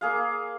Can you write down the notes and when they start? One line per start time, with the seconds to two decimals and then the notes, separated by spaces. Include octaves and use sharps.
0.01 A#3 G#4 F5